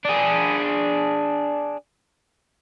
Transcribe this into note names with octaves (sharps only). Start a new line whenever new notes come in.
D4 G#4